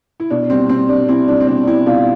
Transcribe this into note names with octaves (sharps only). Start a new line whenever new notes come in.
E4
B2 D4
G3 C4
B2 C4
G3 D4
G3 C4 E4
G3 D4
C4
B2 D4
G3 C4 E4
B2 D4 F4